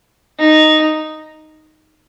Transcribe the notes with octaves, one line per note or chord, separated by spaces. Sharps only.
D#4